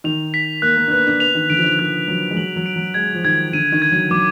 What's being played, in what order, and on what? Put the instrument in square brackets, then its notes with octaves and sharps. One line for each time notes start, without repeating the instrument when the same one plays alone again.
[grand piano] D#3 [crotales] F7
[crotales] B6
[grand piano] A#3 [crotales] F#6
[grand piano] A#3
D4
[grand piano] B3 [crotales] F#6
[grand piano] D4
[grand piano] B3 [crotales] F7
[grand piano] D#3
[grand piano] D3 [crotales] D7
[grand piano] F3
D#3
[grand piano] F3 [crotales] F#6
[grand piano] F#3 [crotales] F#6
[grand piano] G#3
[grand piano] F#3 [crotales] F#7
[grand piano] F#3
[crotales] D7
[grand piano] F#3
[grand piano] G#3 [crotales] G#6
[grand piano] F3
[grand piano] D#3 [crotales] G#6
[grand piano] D3 [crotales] D#7
[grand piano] D#3
[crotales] G#6
[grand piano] F#3
[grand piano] F#3 [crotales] D6